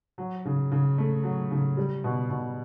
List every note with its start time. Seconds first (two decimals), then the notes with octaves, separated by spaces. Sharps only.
0.18 F#3
0.45 C#3
0.71 C#3
0.98 A3
1.24 F#3
1.51 C#3
1.77 G3
2.04 B2
2.30 B2